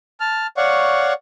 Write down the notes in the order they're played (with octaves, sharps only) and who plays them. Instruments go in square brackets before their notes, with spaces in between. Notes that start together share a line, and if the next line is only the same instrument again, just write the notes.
[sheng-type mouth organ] A5 F6
C#5 D5 F5 F#5 C#6